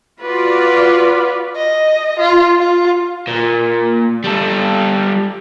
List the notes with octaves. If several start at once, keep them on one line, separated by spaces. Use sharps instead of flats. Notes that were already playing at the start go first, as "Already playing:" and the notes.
F4 F#4 B4 D5
D#5
F4
F4
A#2
G3 A4